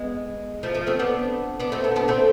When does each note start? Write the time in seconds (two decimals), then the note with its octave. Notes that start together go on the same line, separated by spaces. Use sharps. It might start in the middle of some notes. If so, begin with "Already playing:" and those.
Already playing: G#3 B3
0.63 F3 A3
0.74 F3 A3
0.87 A3 C4
0.99 B3 D4
1.60 B3 D4
1.72 A3 C4
1.84 B3 D4
1.96 B3 D4
2.08 A3 C4